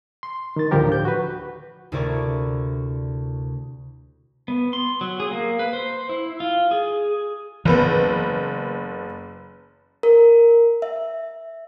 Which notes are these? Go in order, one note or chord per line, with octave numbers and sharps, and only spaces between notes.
C6
D#3 A6
D2 A2 D3 F3 G4 A#4
G6
F#4 B4
D2 C3 E4 A#4 D5 C#6
B3
C6
F#3
G#4
A#3
B4
C5
E4
F4
G#4
F#1 E3 B3 B4
A#4
E5